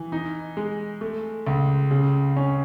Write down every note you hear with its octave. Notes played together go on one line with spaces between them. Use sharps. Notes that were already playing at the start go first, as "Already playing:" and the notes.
Already playing: E3
D#4
G#3
A3
C#2
C#3
C#4